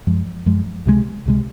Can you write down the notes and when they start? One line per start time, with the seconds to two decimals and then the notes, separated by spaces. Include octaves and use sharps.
0.07 F#2 F3 G#3
0.46 F#2 F3 G#3
0.86 C#2 C3 F3 G#3
1.25 C#2 C3 F3 G#3